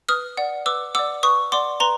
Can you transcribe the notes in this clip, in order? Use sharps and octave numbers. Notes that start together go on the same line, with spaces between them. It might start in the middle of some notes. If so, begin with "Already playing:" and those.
B4 D#6 F6
D5 F#5
B4 D6 E6
D5 F#5 D6 E6
B4 C#6 D#6
D5 F#5 C6 D6
B4 A#5 C6